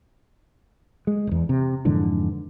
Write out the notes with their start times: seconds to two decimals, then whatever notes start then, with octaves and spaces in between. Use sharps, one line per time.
1.07 G#3
1.27 D#1 E2
1.49 C3
1.85 F2 G#2 D3 E3